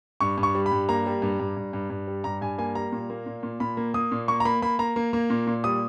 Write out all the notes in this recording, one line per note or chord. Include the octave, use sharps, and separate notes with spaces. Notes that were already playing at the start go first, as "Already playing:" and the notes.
G2 C#6
G2
C#6
G3
B5
G2
A#3 A#5
G3
G2
G2
G2
G2
G2
G3
G2 A#5
G2 G#5
A#3 G#5
G3 A#5
A#2
A#3
A#2
A#2
A#2 B5
A#3
A#3 D#6
A#2
A#3 C#6
A#5
A#3 B5
A#3 B5
A#3 A#5
A#3
A#3
A#2
A#2
G3 D#6